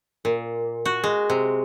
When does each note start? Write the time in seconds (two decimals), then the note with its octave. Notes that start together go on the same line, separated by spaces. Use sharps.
0.25 A#2
0.85 F#4
1.04 G#3
1.30 C3